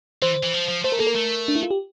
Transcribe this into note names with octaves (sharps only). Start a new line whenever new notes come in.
E3 C5
E3
F3
F3
A3 C5
A#4
A#3 A4
A#4
A3
D4
E4
F4
G4